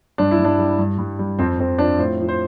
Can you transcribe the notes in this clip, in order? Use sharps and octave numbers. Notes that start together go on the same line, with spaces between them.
G2 D4
E4
G2
D4
G3
G2
G2
G3
F2 C4
F2 C4
F3 D4
A2 C5
F3
C5